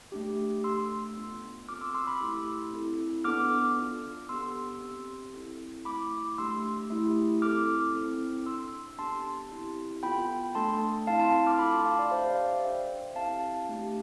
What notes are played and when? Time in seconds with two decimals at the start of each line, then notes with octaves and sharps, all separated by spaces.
0.12 A3 D4 G4
0.64 A3 D4 A4 C6 E6
1.17 B3 D4 F4
1.68 C4 F4 A4 D6 F6
1.81 C6 E6
1.95 C6 E6
2.07 B5 D6
2.21 A3 E4 G4
2.73 C4 E4 A4
3.24 B3 D4 A4 D6 F6
3.77 D4 F4 A4
4.29 B3 D4 G4 C6 E6
4.82 C4 G4
5.34 C4 E4 A4
5.85 A3 E4 A4 B5 D6
6.38 A3 D4 G4 C6 E6
6.90 A3 E4 G4
7.42 C4 E4 A4 D6 F6
7.95 C4 E4 A4
8.46 D4 A4 C6 E6
8.98 B3 D4 G4 A5 C6
9.51 C4 E4 G4
10.03 B3 F4 A4 G5 B5
10.55 A3 D4 A4 A5 C6
11.07 C4 E4 A4 F5 A5
11.20 A5 C6
11.46 D6 F6
11.59 A3 D4 F4 B5 D6
11.72 A5 C6
11.86 F5 A5
11.99 D5 F5
12.11 G4 C5 E5
12.14 D4
12.29 D5 F5
12.46 C5 E5
12.64 D4 A4 E5 G5
13.15 C4 E4 G4 F5 A5
13.69 A3 D4 G4